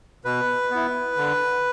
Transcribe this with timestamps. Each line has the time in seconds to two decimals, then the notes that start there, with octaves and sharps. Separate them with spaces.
0.25 B2 B4
0.71 B3 E4
1.17 D3